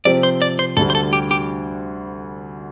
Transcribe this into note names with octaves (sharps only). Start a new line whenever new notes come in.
C3 F3 C4 G4 D5
C5
D5
C5
D2 D3 G3 A4
C5
A4
G4
G4